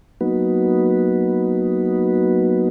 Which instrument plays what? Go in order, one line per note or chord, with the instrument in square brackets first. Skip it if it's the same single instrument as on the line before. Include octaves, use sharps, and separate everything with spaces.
[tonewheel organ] F#3 A#3 B3 D#4 F#4 B4